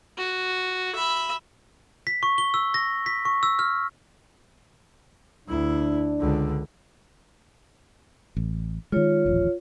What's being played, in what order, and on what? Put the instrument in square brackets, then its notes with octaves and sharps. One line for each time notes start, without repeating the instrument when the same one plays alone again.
[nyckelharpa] F#4
E5 B5
[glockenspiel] B6
C#6
G7
E6
A#6
B6
C#6
E6
F6
[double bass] D2 E4 [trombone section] D4
[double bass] C#2 D3
[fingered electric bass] A1
[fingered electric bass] D#3 G#3 [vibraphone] F4 C#5
[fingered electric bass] D#1 A1 F3